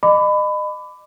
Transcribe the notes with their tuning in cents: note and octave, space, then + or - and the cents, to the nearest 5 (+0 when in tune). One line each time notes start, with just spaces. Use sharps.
D#5 -35 B5 +25 D6 +0